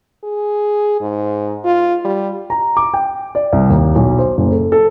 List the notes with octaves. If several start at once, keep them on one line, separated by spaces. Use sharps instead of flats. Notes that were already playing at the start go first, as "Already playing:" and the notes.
G#4
G#2
F4
G3
A#5
D6
G5
D5
C2
D#2
B1
C5
F#1
A4
A4